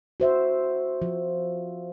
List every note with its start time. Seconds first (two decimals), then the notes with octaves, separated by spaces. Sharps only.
0.20 F#4 C5 E5
1.02 F3